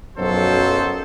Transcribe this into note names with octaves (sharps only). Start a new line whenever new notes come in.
B1 F#2 F3 F#3 A4 C5